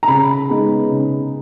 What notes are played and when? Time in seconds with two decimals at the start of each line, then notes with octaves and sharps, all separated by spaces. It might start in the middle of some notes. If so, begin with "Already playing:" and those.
0.03 A#5
0.07 C#3 B5
0.49 G#3 B3 D#4
0.91 C#3